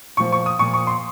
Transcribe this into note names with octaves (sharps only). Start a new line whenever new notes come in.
A#2 F3 C#6
C#6
D#6
A#2 F3 C#6
C#6
C6